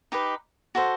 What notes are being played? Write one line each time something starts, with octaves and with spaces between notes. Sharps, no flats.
D#4 G4 B4
F#4 A4 C5